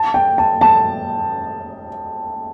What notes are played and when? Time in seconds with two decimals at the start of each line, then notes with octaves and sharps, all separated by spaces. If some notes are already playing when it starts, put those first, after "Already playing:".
Already playing: A5
0.14 G5
0.38 A5
0.61 A5